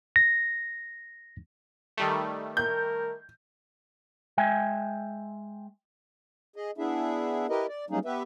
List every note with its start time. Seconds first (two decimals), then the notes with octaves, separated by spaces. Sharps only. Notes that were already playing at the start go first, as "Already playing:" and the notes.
0.16 A#6
1.98 D#3 G3 A3
2.57 A#4 G6
4.38 G#3 E5 G5 G#5
6.56 G#4 D#5
6.78 B3 D4 E4 G#4 E5
7.49 E4 G4 A#4 B4 D#5
7.69 D5
7.90 F#3 G3 A#3 C#4 D#4 G#4
8.05 B3 G4 B4 E5